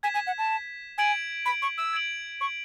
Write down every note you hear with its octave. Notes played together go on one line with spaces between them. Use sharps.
G#5 G#6 B6 E7
G#5
F#5
A5
G#5 G#6 D7 F#7
B5
C#6
E6
G#6 D7 F#7
C#6